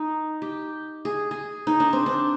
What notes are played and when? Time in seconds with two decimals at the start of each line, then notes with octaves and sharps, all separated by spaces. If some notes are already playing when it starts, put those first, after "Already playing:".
Already playing: D#4
0.42 G4
1.05 G#4
1.31 G#4
1.67 D#4
1.80 D4
1.93 C4
2.06 D4